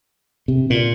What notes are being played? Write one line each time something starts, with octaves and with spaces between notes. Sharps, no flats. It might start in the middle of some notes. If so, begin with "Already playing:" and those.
C3
A#2